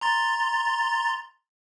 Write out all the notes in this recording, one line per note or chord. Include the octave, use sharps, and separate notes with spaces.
A#5 C6 A6